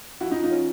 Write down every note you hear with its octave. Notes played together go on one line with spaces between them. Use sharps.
F3 E4 F#4
D#4
F3
D#4 F4
C#4